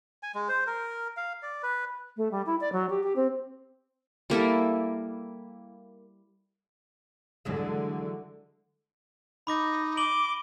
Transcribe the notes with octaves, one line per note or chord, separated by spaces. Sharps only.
G#5
G#3
C5
A#4
F5
D5
B4
A3
G3
E4
D5
F#3
G4
G4
C4
G3 A#3 E4 A4
D3 E3 F#3 G#3
D#4 B5 D6 A#6
D6 D#7 F#7 G7